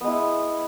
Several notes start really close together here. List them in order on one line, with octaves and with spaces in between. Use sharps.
B3 G#3 E4